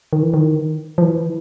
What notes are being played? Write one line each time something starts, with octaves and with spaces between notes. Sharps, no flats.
D#3
E3
D#3
F3
E3